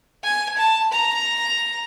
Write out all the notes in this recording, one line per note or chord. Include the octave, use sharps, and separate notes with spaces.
G#5
A5
A#5